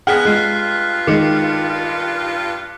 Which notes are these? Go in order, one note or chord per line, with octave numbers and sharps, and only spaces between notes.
G#3 A#3 B3 G#4 F#5 F6 F#6 B6
G2 G#3 F4 F#6 C7
D#3 G#3 D6 C#7